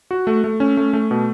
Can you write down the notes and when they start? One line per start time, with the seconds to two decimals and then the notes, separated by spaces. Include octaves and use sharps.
0.11 F#4
0.27 A3
0.44 A3
0.60 C#4
0.77 A3
0.93 A3
1.11 B2